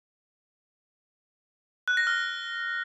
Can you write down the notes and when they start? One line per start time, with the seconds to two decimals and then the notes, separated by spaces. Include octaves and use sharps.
1.88 F#6
1.97 A#6
2.07 F6